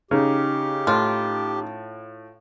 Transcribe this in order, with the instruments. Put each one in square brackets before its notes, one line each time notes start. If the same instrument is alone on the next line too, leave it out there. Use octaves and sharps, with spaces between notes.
[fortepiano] C#3 [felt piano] C#4 D#4 [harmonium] G4
[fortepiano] A2 [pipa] F4